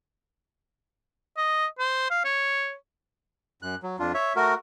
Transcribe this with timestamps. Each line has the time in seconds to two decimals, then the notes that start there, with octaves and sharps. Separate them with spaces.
1.37 D#5
1.79 C5
2.10 F5
2.25 C#5
3.62 F#2 F#6
3.83 F#3
3.99 F2 D4 F4
4.14 C#5 E5
4.36 A3 F#4 A#4